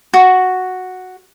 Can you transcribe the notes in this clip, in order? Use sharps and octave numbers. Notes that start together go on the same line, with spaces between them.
F#4